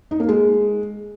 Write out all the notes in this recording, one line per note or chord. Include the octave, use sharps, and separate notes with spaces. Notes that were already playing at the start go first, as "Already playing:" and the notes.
D#4
A#3
G#3